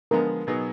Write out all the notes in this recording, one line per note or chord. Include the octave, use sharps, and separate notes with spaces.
D3 F3 G#3 B3 A#4
B2 F#3 B3 D#4 G#4